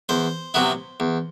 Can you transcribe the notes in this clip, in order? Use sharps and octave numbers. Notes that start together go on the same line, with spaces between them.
E2 C5
C3 F#3 B3 E4
E2